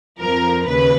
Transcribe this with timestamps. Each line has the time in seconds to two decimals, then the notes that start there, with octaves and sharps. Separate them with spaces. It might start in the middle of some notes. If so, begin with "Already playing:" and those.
0.20 F2 F3 A#4
0.66 D#2 C#3 B4